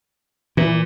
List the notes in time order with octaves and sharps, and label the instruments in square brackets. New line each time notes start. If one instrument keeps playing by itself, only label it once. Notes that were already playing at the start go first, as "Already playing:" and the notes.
[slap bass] A#2 [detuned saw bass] E3